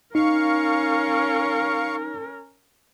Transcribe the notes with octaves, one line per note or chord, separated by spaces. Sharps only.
C#4 D#4 A#4 F5 C#6